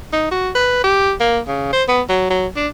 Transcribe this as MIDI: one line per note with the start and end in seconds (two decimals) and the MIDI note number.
0.13 0.30 63
0.31 0.49 66
0.55 0.82 71
0.84 1.12 67
1.20 1.39 58
1.48 1.72 49
1.73 1.83 72
1.88 2.01 59
2.09 2.26 54
2.30 2.46 54
2.56 2.67 62